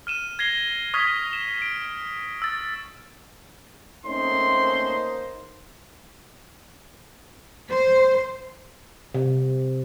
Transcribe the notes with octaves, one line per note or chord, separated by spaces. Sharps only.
F6 D#7 E7
G#6 A#6 C7 G7
C#6 D#6 F6 G#6 B6
E7
D7
E6 A6
A3 A#3 C4 C#4 D#4 C5 C6
C5
C3